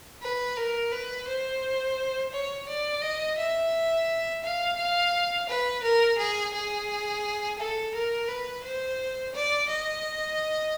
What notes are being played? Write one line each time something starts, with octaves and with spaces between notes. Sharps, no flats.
B4
A#4
B4
C5
C#5
D5
D#5
E5
F5
F5
B4
A#4
G#4
G#4
A4
A#4
B4
C5
D5
D#5